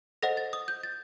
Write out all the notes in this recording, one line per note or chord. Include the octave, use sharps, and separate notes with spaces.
A4 C5 D#5 F#5 A#6
A6
D#6
G6
A6